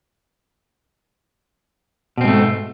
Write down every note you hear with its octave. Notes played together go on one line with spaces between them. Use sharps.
G#2 B2 A3 C4